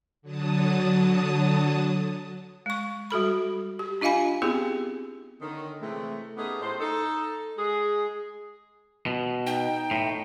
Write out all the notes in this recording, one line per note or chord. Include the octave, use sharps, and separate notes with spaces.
D3 F#3 A5 D#6
G#3 C#6
G3 F#4 A4 B5
G4
D4 F4 D#5 F5 G#5 B5
B3 C4 E4 G4 G#4
D3 D#3 C#4
C3 E3 G#3 A3
A3 B3 C#4 D#4 G4 G#4
A2 C5
D#4 A4
G#3 G#4
B2
D#4 G5
A2